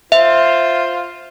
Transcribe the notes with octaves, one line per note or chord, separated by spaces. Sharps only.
F4 C5 E5